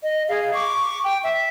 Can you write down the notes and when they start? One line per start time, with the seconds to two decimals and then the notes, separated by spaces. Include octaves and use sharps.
0.03 D#5
0.29 G#4 F5
0.53 C#6 D6
1.04 G5
1.23 E5